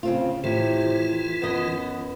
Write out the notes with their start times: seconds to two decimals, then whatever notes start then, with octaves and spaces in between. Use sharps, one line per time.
0.03 C#3 C4 F4
0.44 A2 C3 E3 F4
1.42 F#2 B3 D#5